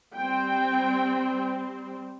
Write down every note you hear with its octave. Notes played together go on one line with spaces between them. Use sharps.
G3 C4 G5